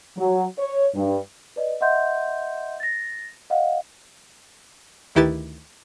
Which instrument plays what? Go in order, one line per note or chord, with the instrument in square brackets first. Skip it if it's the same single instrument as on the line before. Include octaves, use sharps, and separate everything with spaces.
[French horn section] F#3
C#5
G2
[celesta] B4 D5 D#5
D#5 E5 F#5 C6 G6
A6 A#6
D#5 F5 F#5
[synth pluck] D2 D#3 E4 G4 B4 A6